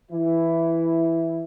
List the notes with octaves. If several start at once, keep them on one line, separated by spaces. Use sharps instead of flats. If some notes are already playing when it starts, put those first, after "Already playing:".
E3 E4